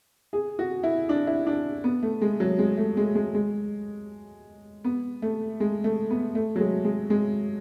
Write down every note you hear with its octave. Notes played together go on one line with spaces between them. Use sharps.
G#4
F#4
E4
D4
E4
D4
B3
A3
G#3
F#3
G#3
A3
G#3
G#3
G#3
B3
A3
G#3
A3
B3
A3
F#3
G#3
G#3
G#3